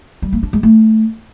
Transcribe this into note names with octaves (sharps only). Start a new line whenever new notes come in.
G3
A#3
D4
G#3
A3